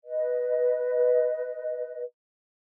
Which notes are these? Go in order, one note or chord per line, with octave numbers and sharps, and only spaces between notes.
B4 D#5